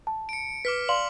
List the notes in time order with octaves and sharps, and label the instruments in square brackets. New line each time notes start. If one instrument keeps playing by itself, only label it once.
[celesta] A5
[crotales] C#7 D7
[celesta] B4 [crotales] D6 F6 B6
[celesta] D5 F5 C6 [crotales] F#7